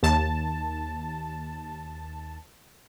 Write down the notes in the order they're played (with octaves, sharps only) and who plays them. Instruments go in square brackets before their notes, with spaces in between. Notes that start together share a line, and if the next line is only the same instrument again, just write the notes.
[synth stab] D#2 A5